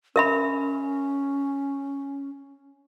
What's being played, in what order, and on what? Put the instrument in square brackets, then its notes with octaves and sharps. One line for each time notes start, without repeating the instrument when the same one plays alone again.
[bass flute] C#4 [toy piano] A#4 E5 B5